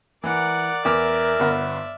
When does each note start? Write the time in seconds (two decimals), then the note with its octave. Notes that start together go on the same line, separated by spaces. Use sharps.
0.24 E3 A#4 D5 F#5
0.85 E2 A#4 E5 D6 F6
1.40 G1 B3 F#5